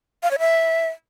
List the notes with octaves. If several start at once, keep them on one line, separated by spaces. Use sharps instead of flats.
F5
C#5
E5